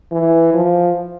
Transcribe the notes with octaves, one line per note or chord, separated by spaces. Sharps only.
E3
F3